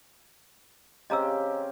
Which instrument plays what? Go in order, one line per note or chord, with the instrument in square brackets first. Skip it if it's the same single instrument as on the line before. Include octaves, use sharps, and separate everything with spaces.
[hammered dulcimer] C#3 C4 G4 [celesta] D#5 A#5 E6